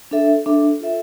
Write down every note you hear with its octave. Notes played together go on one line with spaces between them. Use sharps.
D4 A4 E5
D4 A4 E5
F4 A4 E5